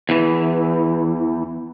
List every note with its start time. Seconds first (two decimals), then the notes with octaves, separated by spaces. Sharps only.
0.09 E2 E3